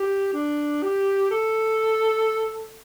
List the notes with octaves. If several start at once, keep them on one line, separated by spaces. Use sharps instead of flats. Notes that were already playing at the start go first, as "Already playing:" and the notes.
Already playing: G4
D4
G4
A4